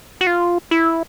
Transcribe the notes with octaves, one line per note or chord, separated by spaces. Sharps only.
F#4
F4
E4